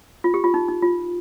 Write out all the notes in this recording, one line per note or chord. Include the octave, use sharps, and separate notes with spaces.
F4
G4
F4
D#4
D#4
F4